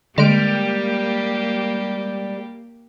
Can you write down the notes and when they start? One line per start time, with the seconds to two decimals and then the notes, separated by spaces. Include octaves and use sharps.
0.18 D3 G3 G#3 A#3 G4 F6 D7